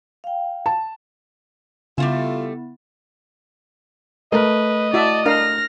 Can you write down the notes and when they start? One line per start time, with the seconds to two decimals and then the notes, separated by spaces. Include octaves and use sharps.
0.24 F5 G5
0.66 A5
1.98 C#3 G3 A3 B3 E4 F4 E5
4.32 A3 A#4 B4 D#5
4.93 E4 F#4 D5 E5 A5
5.26 D4 A#4 F5 F6 A#6